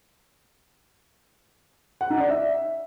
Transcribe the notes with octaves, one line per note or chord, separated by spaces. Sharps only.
F#5
D#4
D5
E5